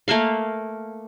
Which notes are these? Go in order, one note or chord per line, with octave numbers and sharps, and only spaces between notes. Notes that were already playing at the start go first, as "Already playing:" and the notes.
A3 A#3 A#4 F5